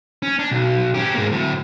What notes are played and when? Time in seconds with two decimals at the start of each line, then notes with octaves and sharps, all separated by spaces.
0.23 C#4
0.39 D4
0.51 B1
0.94 C#4 G4
1.15 G#2 A#3
1.32 D2 A2